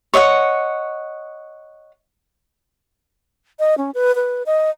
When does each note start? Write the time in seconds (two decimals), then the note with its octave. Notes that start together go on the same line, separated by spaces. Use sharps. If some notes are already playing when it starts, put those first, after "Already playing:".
0.14 C#5 D#5 E5 F#5
3.59 D#5
3.78 C#4
3.94 B4
4.15 B4
4.46 D#5